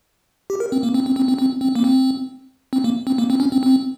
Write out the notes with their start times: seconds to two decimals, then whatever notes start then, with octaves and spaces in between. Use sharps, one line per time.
0.50 G4
0.60 A#4
0.72 C4
0.83 A#3
0.94 C4
1.06 C4
1.16 C4
1.28 C4
1.39 C4
1.61 C4
1.75 A#3
1.84 C4
2.73 C4
2.84 A#3
3.07 C4
3.18 A#3
3.30 C4
3.40 C#4
3.52 C4
3.63 C4